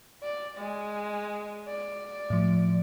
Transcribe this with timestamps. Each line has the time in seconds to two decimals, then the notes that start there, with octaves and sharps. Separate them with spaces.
0.23 D5
0.58 G#3
1.68 D5
2.30 A2 F3